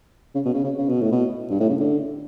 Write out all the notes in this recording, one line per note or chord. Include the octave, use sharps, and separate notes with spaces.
C#3
B2
C#3
C#3
C#3
B2
A2
B2
G2
A2
C#3
D3